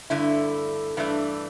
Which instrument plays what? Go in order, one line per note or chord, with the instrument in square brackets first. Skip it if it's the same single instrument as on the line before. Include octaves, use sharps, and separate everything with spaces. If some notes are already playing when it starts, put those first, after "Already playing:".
[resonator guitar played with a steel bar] G2 D3 A3 E4
G2 E3 A3 D4